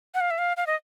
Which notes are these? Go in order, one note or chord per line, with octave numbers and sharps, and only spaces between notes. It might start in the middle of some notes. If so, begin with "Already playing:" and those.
F#5
F5
E5
F5
F5
D#5